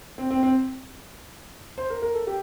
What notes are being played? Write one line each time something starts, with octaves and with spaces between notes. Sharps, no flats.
C4
C4
C4
C5
A#4
A#4
A4
G4